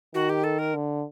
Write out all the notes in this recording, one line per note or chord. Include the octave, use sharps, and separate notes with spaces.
D#3 F#4
G4
A4
A#4
D3